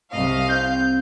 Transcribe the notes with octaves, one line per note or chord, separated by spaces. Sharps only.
C2 D#5 F5
C4 G6